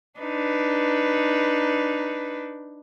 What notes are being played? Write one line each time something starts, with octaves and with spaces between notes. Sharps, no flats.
D4 D#4 B4